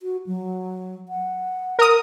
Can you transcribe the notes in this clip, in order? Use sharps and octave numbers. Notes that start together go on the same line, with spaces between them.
F#4
F#3
F#5
A#4 D#6